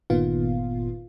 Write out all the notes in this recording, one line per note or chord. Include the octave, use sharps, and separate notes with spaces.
G1 A#2 D#3 B3 F4 F5